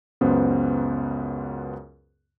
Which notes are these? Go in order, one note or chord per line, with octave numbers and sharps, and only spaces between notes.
C#2 F#2 B3 C5